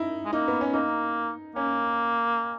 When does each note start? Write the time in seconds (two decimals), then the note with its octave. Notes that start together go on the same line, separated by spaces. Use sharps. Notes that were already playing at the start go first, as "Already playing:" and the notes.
Already playing: D#4 E4
0.25 G#3
0.33 A#3 D#4
0.48 B3
0.61 C#4
0.73 A#3 D#4
1.56 A#3 C#4